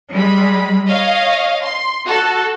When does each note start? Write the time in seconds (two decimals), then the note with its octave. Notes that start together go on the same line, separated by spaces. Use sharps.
0.13 G3 G#3 B5
0.88 C#5 D#5 F5
1.64 C6
2.06 F#4 A4 A5